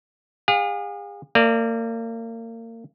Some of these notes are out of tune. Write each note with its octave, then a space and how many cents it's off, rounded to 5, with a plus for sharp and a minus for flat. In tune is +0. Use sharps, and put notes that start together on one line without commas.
G#4 -40 F5 +35
A#3 -35 D5 +0